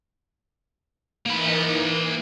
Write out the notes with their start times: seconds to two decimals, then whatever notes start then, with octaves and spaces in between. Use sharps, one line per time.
1.26 E3 A#3 D#4 A#4 B5
1.70 E3